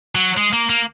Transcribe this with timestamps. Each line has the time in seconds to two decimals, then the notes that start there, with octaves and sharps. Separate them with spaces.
0.15 F#3
0.37 G#3
0.53 A#3
0.70 A#3